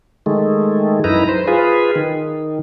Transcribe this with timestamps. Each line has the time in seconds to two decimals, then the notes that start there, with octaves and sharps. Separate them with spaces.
0.26 D#3 G#3 A3
1.04 F#2 D#4 E4 B4 A#5
1.29 C5
1.47 F4 G#4 B4
1.95 D#3